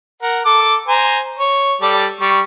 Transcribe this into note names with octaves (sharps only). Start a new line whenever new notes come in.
A#4 F#5
A4 D6
C5 G#5 A#5
C#5
G3 A4 D5
G3 C#6